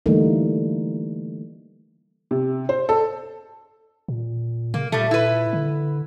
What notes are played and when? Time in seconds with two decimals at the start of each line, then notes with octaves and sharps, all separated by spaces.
0.06 D3 E3 G3 A3 A#3 D#4
2.31 C3
2.69 C5
2.89 A4
4.08 A#2
4.74 C#3 A#3
4.92 A#2 G3 A3
5.11 E4 B4
5.53 D3